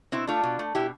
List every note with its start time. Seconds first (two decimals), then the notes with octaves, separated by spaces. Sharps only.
0.12 B2 C4 E4
0.27 A3 D4 F4
0.44 B2
0.59 A3
0.75 B2 E4 G4